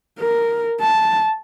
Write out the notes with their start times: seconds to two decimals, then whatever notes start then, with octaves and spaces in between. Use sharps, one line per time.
0.20 A#4
0.81 A5